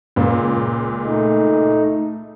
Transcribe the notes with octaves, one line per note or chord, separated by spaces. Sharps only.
C#2 A#2
A3 D#4